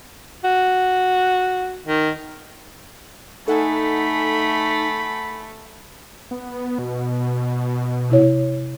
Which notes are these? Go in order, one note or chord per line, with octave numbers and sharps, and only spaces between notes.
F#4
D#3
A3 D#4 A4 F#5 G#5 B5
B3
B2
C3 E4 C#5